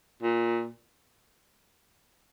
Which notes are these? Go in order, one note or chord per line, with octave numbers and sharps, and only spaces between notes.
A#2